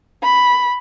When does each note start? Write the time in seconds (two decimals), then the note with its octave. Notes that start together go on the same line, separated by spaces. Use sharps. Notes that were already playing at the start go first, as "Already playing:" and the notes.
0.23 B5